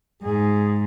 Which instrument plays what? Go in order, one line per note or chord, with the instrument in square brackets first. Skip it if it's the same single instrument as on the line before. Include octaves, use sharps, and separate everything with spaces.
[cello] G#2 [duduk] G#4